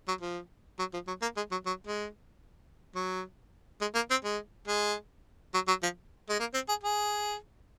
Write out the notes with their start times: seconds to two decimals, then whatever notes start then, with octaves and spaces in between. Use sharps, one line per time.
0.08 F#3
0.21 F3
0.79 F#3
0.94 F3
1.08 F#3
1.22 A#3
1.37 G#3
1.52 F#3
1.66 F#3
1.87 G#3
2.95 F#3
3.81 G#3
3.95 A#3
4.11 C4
4.24 G#3
4.68 G#3
5.54 F#3
5.68 F#3
5.83 F3
6.30 G#3
6.40 A#3
6.54 C4
6.69 G#4
6.83 G#4